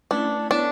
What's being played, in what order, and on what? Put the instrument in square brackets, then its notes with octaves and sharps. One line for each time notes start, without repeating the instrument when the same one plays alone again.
[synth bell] A3 C#4 E4 B4 [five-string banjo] D4
[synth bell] B3 E4 A4 C#5 [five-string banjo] D4